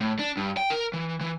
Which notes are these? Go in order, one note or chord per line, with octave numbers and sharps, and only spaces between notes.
A2
D4
G2
G5
A#4
E3
E3